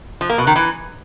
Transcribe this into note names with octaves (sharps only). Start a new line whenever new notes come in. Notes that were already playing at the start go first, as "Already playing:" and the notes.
F3
A#3
B2
D#3
E3